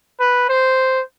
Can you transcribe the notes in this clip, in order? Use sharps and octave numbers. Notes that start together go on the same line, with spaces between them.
B4
C5